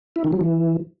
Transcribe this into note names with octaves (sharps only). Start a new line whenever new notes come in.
E4
D#3
F#3
E3